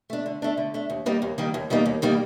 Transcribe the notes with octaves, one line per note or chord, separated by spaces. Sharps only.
A3 D4
D3
A3 D4
D3
A3 D4
D#2
D#3 G3 A#3 D#4
D#2
D#3 G3 A#3 D#4
D#2
D#3 G3 A#3 D#4
D#2
D#3 G3 A#3 D#4